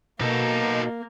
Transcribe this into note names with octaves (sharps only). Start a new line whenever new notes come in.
B2 A#3 D#4 A4